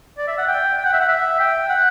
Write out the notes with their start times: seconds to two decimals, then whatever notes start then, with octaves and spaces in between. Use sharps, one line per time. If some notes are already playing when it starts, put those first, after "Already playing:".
0.18 D5
0.27 E5
0.38 F#5
0.47 G5
0.78 G5
0.85 F#5
0.93 E5
1.00 F#5
1.08 E5
1.39 G5
1.69 F#5